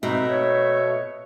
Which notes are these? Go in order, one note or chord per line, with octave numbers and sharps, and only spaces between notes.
B2 A3 C4 D#4 E5
C#5